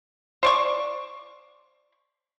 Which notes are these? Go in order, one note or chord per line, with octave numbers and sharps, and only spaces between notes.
C5 D5 C#6